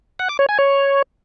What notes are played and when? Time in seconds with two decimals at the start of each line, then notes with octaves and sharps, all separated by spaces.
0.19 F#5
0.29 D6
0.39 C#5
0.49 G#5
0.59 C#5